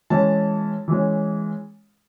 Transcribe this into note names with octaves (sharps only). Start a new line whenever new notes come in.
E3 G#3 C#4 A5
E3 G#3 C#4